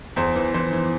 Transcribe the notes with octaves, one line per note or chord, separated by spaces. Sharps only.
E2 C5
E3
E3 C5
E3